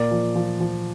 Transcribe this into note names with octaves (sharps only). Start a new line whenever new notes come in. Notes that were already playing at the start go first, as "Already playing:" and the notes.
Already playing: A#2 A#4 D5
F3
F3
F3